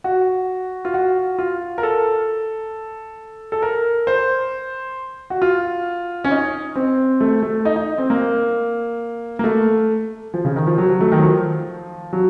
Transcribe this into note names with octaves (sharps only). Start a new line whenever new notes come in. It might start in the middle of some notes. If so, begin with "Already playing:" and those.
F#4
F4
F#4
F4
A#4
A4
A4
A#4
C5
F#4
F4
C#4
D#4
C4
A3
A3
D#4
D#4
C4
A#3
A#3
A3
F3
C#3
D#3
F3
F#3
F#3
A3
D#3
F#3
F3
F#3